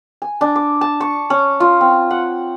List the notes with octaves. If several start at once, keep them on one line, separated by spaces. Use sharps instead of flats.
G#5
D4
D6
A5
C#6
C#4
F4
C4
F#5